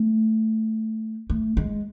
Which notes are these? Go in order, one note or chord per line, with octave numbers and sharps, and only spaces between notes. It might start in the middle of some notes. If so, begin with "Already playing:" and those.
Already playing: A3
A3
G#3